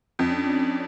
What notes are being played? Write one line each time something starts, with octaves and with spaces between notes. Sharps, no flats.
F2 C#4 D4 D5